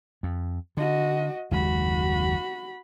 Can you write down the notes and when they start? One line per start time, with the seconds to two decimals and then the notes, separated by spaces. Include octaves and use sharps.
0.23 F2
0.77 D3 F#4 D#5
1.51 F#1 D#2 G#3 F#4 B5